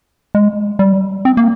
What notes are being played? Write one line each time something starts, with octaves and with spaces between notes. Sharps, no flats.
G#3
G3
C4
A#3